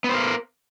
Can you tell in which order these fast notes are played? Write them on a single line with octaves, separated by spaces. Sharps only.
B3 C5 A#4